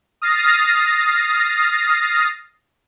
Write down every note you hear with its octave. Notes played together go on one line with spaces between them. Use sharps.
D#6 F6 A6 A#6 C7